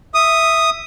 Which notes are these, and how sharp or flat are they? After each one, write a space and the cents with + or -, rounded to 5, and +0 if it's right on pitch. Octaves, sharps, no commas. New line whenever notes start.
E5 +0 D#6 +0